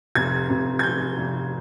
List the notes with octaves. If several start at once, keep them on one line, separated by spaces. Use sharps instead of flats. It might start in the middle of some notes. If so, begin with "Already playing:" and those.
F1 F2 C3 G#6
F1 F2 C3
G#6
F1 F2 C3 G6
F1 F2 C3